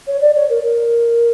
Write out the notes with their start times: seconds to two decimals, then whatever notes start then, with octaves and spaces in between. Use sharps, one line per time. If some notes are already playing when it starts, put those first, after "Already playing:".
0.08 C#5
0.21 D5
0.36 C#5
0.50 A#4
0.63 A#4